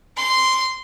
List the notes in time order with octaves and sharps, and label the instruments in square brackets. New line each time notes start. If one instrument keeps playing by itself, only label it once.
[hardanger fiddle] C6